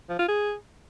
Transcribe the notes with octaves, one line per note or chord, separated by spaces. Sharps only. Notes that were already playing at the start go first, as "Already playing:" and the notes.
F3
F4
G#4